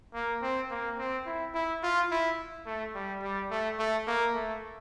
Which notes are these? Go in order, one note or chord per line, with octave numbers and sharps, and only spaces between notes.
A#3
C4
A#3
C4
E4
E4
F4
E4
A3
G3
G3
A3
A3
A#3
A3